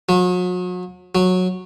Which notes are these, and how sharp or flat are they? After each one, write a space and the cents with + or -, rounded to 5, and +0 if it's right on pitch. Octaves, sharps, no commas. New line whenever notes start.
F#3 -40
F#3 -15